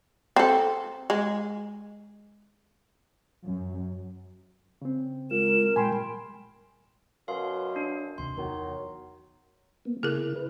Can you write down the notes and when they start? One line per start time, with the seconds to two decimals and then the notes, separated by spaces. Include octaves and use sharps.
0.36 C4 A4
1.10 G#3
3.44 F#2
4.82 C#3 C4
5.31 G#3 F4 A#4 E7
5.76 A#2 G3 G#3 G5 G#5 B5 C6
7.28 F#2 B2 F5 C6
7.76 D4
8.18 D#2 C3 C6
8.37 E2 D#3 F#3
9.85 A#3 B3
10.03 C#3 E4 G#4 A#4
10.35 B4